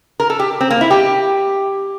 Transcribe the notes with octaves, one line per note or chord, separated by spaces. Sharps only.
A#4
A4
G4
C4
A#3
E4
G4